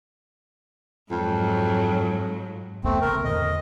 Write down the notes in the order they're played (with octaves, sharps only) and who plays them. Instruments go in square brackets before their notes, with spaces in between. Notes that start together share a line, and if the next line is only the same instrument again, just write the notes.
[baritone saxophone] F2 [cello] G#2 F#3
[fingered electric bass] B1 E2 B3 [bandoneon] A3 C4
[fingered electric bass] C#3 G#3 A#3 [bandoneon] A#4
[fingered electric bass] E2 A2 D3 [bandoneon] D#5